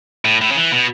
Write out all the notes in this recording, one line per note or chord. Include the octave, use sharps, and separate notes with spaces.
A2
A2
C#3
E3
B2